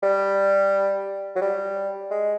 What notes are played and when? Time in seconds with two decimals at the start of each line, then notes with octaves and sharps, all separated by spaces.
0.03 G3
1.36 F#3
1.41 G3
2.11 G#3